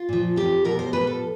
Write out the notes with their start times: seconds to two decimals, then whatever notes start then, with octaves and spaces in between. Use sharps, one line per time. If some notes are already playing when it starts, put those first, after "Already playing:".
Already playing: F4
0.09 A#2 F3
0.36 F2 C3 F3 G4
0.65 B2 F#3 A#4
0.79 C5
0.93 A#2 F3 B4
1.07 A4